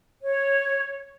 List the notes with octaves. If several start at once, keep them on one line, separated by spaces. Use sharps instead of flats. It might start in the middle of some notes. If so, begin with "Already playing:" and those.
C#5